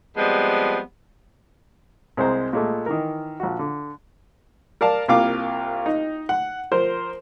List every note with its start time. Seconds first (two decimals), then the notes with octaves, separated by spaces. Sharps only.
0.17 F3 G3 G#3 B3 C4
2.17 C2 G#3 C4 C5 A#5
2.53 A#2 G#3 A3
2.86 D#3 E3 A#4
3.40 A#1 F#4
3.59 D3
4.81 A#4 D5 F5 A5
5.08 C2 A#3 F4 F5 D6
5.86 D#4
6.29 F#5
6.72 F3 A#4 C5